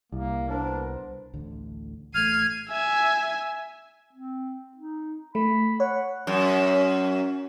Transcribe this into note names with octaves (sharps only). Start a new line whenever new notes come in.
C2 A#3
B3 D4 A#4 C5
A1 D2 D3
A1 A3 F6 G#6 C7 D#7
E5 G#5
C4
D#4
A3 B5
C#5 F#5
F#2 C#4